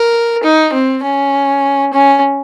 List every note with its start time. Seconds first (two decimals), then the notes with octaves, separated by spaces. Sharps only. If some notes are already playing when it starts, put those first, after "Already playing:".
Already playing: A#4
0.44 D#4
0.73 C4
1.03 C#4
1.93 C#4